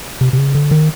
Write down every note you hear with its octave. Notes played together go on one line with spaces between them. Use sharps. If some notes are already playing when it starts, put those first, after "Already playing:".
C3
C3
C#3
D3
D#3